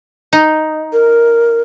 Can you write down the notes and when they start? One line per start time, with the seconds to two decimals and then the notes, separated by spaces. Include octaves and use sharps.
0.33 D#4
0.93 A#4